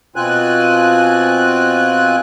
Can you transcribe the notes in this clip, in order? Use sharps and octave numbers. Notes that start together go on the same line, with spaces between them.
B2 C4 F4 G#5 F#6